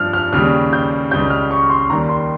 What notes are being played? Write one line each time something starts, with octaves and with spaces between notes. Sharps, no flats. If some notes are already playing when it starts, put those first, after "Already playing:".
Already playing: G2 F3 F6
F6
D#2 C#3 G3 F6
G6
C#2 C#3 G3 G6
F6
C#6
C6
D#2 D#3 G3 A#5
C6